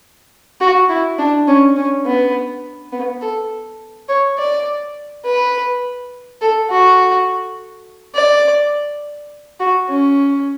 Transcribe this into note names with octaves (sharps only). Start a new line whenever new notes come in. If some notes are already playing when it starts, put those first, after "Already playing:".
F#4
E4
D4
C#4
C#4
B3
B3
A4
C#5
D5
B4
A4
F#4
D5
F#4
C#4